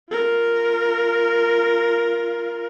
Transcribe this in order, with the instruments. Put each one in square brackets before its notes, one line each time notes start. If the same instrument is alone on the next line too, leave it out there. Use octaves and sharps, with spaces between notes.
[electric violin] F4 A#4